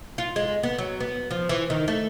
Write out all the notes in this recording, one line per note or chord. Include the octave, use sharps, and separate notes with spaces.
F4
G#3
B3
F#3
B3
F3
E3
D#3
A3